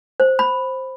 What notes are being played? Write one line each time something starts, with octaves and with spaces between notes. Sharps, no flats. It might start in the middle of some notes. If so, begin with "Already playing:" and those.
C5
B5